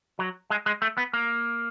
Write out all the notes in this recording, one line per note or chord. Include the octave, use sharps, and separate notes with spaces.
F#3
G#3
G#3
A3
B3
A#3